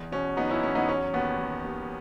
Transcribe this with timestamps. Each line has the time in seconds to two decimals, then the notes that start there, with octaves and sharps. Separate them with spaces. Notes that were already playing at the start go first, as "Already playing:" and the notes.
Already playing: E2
0.12 B2 C#4
0.37 F#3 B3 D#4
0.50 C#4 E4
0.63 E2 C#4
0.75 B3 D#4
0.88 F#3 C#4
1.13 D#2 B3
1.39 D#2
1.64 D#2